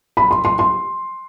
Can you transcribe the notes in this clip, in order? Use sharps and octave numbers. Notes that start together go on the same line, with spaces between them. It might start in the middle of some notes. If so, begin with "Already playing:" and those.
B5
C6
C6
C6